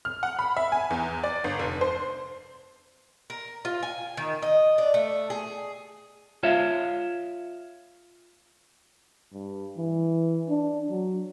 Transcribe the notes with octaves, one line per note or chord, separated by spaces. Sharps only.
F6
F#5
B5
E5
G#5
E2
D5
G1
F1
C5
A#4
F4
G#5
D#3
D#5
D4
A3
G#4
F4 C#5 E5 F5
G2
E3
D4
F#3